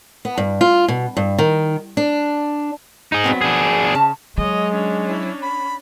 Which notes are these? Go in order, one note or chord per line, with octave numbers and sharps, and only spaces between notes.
B3
G2
F4
B2
G2
D#3
D4
D#4 G#4
F#3 B3 C4
D4 G#4
C#3 A5
F#3 G#3 C#5 D#5
C#4 D4
E4
B5